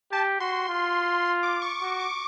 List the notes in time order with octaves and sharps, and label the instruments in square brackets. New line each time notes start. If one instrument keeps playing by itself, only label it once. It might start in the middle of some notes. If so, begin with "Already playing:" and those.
[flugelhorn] G4 [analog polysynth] A5
[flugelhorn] F#4 [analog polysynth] C6
[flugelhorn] F4
[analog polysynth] C6
D6
C#6
[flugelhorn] F#4 [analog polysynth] C#6
[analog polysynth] D6